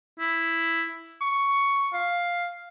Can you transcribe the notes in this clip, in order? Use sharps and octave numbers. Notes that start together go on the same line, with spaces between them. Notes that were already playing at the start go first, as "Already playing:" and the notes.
E4
C#6
F5